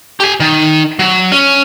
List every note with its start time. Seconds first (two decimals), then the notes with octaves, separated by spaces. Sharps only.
0.20 G4 G#5
0.40 D#3
0.99 F#3
1.32 C#4